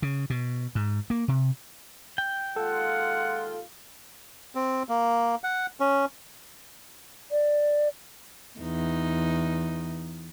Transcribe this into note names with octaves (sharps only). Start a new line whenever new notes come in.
C#3
B2
G#2
A#3
C3
G5
D#2 G#3 F4 A4 F#5
C4
A#3
F#5
C#4
D5
E2 D#4